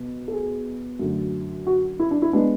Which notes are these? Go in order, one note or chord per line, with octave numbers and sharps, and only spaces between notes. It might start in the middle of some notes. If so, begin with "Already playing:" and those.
Already playing: B2 B3
A4
G#4
F#2 D3 F#3 A3
F#4
E4
D4
E4
G#3 B3 D4